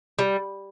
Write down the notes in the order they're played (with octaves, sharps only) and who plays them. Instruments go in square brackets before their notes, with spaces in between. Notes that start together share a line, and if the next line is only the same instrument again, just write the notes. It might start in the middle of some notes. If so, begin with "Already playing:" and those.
[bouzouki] G3